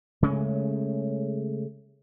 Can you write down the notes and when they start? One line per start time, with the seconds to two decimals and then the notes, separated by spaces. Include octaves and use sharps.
0.22 C#3 G#3 A3 C#4